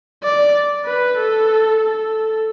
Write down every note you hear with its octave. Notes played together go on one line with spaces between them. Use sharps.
D5
B4
A4
A4